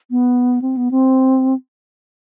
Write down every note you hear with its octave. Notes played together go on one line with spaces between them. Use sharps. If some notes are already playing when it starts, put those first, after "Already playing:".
B3
C4
B3
C4